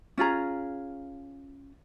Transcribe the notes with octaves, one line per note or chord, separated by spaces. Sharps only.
C#4 F4 G#4 A#5